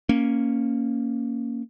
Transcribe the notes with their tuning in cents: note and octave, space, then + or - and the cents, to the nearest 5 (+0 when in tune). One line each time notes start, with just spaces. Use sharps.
A#3 +0 C#4 +0